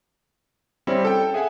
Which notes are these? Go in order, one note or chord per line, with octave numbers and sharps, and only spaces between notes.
G3 C4 C#4 E4
A4 G5
G#4 E5 F#5 G#5